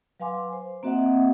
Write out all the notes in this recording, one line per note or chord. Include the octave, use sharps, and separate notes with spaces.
F#3 B4 F5 G#5 C6 D6
C5
A#3 C4 F#4 D#5 E5 F#5